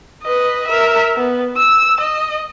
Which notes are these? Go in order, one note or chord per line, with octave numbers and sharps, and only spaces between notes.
B4 D#5
A#4 E5
B3
E6
D#5